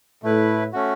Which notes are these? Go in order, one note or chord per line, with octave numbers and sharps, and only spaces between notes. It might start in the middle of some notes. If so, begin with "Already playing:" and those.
A2 A3 E4 B4
A3 C#4 F#4